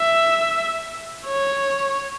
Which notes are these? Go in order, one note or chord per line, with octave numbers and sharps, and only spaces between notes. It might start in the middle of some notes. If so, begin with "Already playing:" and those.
Already playing: E5
C#5